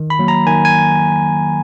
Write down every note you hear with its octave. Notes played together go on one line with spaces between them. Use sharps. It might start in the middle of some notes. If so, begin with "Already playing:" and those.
Already playing: D#3
B5
F#3 A#3
A#5
D#3 G#5
G#5